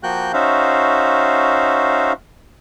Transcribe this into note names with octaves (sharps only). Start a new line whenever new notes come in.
F3 A#3 F#4 G5 F#6 G6
C#4 D#4 F#4 C5 E5 F5